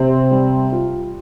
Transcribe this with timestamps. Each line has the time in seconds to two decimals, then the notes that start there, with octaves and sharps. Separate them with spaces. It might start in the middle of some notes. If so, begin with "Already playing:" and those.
Already playing: C3 C4
0.31 G3
0.72 F4